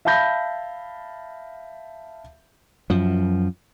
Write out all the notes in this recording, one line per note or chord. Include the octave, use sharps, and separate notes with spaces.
E5 F5 A5 B5 G6 A#6
F#2 F3